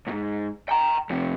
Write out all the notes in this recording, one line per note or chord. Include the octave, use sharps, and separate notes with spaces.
C2 G#2
G5 A#5
F2 C3